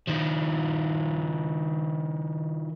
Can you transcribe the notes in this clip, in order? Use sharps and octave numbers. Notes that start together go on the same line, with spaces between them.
D#3 F3